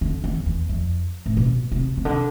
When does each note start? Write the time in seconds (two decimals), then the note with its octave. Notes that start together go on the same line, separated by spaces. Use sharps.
0.01 D3
0.24 E2
0.46 E2
0.69 F2
1.26 A2
1.37 B2
1.72 C3
1.97 C3
2.05 D3